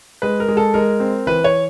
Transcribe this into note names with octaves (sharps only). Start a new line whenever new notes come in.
G#3 B4
A#4
G#3
A4
G#3 A#4
C4
E3 B4
C#5